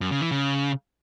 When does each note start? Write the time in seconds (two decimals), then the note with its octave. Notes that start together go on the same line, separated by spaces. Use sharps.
0.01 F#2
0.11 C#3
0.21 E3
0.31 C#3